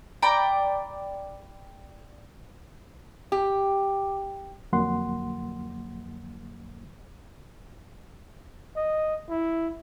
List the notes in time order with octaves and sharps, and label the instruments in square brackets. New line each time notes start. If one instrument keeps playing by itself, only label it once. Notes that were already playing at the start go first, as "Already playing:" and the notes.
[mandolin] D5 G5 A#5 B5
[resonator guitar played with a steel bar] G4
[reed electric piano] F2 D3 F#3 A#3 F#5 C6
[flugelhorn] D#5
E4